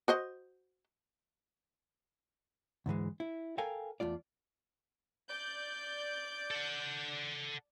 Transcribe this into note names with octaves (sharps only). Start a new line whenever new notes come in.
F#4 C5 D#5
D2 G#2 E3 G#3
E4
A4 A#4 F5 G5 G#5
E2 A3 F4 D5
D5 G6
A4 F#5